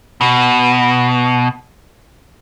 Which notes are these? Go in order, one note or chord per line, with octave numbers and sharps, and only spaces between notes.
B2